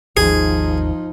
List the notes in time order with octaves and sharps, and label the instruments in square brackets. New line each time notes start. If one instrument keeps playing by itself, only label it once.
[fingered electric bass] G#1 D#2 [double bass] F3 D#4 [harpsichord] G#4